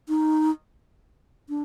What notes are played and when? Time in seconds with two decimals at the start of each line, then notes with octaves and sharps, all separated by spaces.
0.08 D#4
1.49 D4